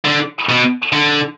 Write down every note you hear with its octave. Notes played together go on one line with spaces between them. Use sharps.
D3
B2
D3